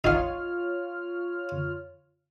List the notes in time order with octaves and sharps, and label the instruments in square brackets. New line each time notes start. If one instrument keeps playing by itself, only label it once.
[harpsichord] D#4 F5 [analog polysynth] F4 C#5 F6